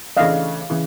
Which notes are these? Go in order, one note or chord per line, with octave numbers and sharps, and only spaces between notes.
C#3 E3 A3 D4 D#5 F5
C#3 E3